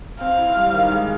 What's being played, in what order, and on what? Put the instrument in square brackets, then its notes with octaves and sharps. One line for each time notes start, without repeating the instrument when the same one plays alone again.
[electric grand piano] C4 [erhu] F5
[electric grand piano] E4
G3
D#3
G#3